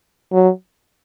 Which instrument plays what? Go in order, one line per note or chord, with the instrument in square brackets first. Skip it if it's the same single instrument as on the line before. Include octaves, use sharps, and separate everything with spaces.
[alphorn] F#3